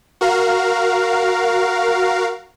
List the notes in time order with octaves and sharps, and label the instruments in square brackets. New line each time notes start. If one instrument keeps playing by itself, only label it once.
[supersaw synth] F#4 A#4 F5